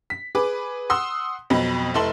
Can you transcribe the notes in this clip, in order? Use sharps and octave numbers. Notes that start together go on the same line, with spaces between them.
B6
G#4 B4 D6
F#5 C6 D#6 E6
F2 B2 F#3 D#5 B5
F1 E4 A4 C6 F#7